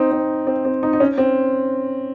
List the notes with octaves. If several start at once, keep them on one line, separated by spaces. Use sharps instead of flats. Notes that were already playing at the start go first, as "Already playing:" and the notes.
Already playing: C4 D#4
C4
C4
C4
D#4
D#4
C#4
C4